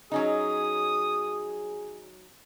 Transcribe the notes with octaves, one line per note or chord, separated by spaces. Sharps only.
F#3 C#4 D#4 G#4 D#6